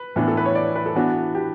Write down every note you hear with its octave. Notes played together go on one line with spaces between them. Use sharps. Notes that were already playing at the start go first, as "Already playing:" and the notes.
Already playing: B4
A2 E3 B3 D4
A4
B4
C#5
D5
B4
A4
E3 B3 D4 F#4
G4